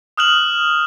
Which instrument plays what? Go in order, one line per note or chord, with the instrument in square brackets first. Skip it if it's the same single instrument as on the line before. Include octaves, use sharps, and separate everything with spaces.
[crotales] D#6 F6 F#6 E7 F#7